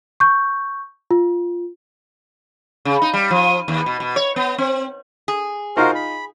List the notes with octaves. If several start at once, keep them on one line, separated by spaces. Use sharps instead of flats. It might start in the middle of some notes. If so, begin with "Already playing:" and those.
C#6 G6
F4
C#3
D#4
G3
F3
D#2
B2
B2
C#5
B3
C4
G#4
D#4 F4 F#4 A#4 C5
B5